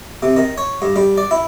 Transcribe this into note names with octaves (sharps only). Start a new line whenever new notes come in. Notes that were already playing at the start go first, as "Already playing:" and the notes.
C3
D#3
C#5
G2
G3
D5
E4